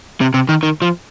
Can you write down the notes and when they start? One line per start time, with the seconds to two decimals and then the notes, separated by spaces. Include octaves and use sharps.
0.21 C3
0.34 C3
0.49 D#3
0.63 D#3
0.82 F3